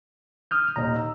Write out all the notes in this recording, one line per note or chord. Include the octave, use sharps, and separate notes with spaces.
D#6 F6 G6
D#1 D#2 D#4 A#5
E6